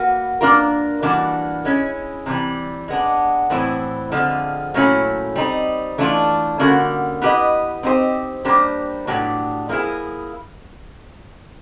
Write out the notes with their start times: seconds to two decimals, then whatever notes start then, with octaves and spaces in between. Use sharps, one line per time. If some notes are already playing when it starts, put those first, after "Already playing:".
Already playing: A#3 F#4 B4
0.41 A#3 D4 F4 A#4
1.02 E3 G3 A#3 D4 F#4
1.65 G#3 C#4 E4
2.26 C3 E3 G3
2.88 G#3 B3 D4
3.50 A2 E3 G3 C4 E4
4.12 D3 F3 G#3 C4 F4
4.74 A#2 F#3 A3 C#4 E4
5.36 G3 C4 D#4
5.98 E3 A3 D4 F4
6.59 D3 G3 A#3 C#4 F#4
7.22 B3 E4 G4 B4 D#5
7.83 C4 D#4 G4 C5
8.45 G3 A#3 D4 G4 C5
9.07 A2 F#3 B3 D4 G4
9.69 F3 A#3 C#4 E4 G#4